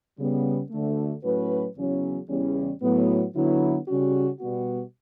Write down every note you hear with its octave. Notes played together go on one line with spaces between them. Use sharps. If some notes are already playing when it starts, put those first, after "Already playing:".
C#3 G3 B3
D2 D3 A3
A2 F#3 C#4 F#4 B4
E2 C#3 F#3 C#4
E2 C#3 G3 C#4
A2 F#3 B3
D3 F#3 B3 E4
C#3 G3 C#4 F#4
B2 G3 B3 F#4